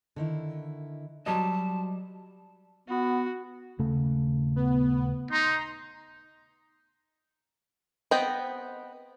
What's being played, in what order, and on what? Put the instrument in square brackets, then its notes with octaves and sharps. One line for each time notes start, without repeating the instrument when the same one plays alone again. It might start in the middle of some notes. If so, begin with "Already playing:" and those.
[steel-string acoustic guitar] D3 D#3 E4
[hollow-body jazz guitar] F#3 G3 D#5 [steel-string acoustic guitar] F#4 C5 [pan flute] A5
[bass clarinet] B3 [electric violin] F#4
[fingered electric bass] D#1 C#3 A3
[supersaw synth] B3
[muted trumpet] D#4 [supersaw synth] A#5 C6
[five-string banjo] B3 C4 D#5 G5